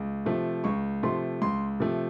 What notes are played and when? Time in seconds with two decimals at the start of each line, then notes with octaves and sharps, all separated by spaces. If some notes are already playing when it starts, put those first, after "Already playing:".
Already playing: C#2
0.26 C3 F3 A3
0.64 C#2 C#6
1.03 C3 F3 A3 C6
1.42 C#2 C6
1.80 C3 F3 A3